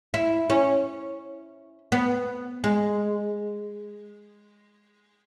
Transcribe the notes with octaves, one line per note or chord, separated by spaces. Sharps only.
E4
C#4
B3
G#3